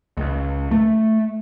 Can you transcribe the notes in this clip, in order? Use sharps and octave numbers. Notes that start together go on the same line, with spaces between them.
C#2
A3